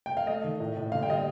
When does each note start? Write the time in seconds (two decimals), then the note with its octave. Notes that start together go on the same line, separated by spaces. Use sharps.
0.06 G5
0.17 F5
0.27 A3 D#5
0.44 D#3
0.60 A2
0.77 A2
0.92 D3 F5
1.03 G5
1.08 G3 D#5
1.13 F5